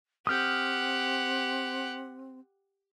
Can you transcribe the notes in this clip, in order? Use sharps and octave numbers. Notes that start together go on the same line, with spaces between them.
C4 G4 F#5 D#6 F6 G6